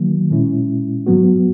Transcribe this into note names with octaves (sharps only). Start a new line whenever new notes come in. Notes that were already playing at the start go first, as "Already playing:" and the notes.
Already playing: D#3 F#3 A#3
A#2 G#3 C#4 E4
G#2 F#3 B3 F#4